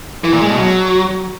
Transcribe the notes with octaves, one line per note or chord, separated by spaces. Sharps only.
E3
A#2
G#3
B2
F#3